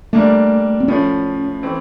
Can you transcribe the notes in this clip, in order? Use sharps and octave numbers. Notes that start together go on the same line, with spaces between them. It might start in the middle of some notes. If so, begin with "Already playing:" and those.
G3 A3 A#3 D4
C4
A2 F3 A3 C#4
E3 A3 C4